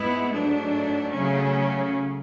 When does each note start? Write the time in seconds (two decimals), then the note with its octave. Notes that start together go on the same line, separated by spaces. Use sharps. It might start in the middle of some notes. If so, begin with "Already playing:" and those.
Already playing: G#2 G#3 B3 E4
0.32 G#2 F#3 A3 D4
1.13 C#3 F#3 A3 C#4